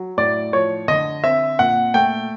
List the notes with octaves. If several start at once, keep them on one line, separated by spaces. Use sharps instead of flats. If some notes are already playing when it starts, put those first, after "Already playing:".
Already playing: F#3
A2 D5
F3 C#5
D3 D#5
C4 E5
A#2 F#5
A3 G5